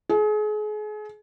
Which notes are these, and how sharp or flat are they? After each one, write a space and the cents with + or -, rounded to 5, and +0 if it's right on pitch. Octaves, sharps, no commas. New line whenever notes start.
G#4 +35